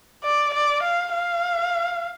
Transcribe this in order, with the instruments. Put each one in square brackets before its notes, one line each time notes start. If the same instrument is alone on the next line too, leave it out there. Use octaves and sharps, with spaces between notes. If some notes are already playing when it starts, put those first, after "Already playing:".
[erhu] D5
D5
F5
F5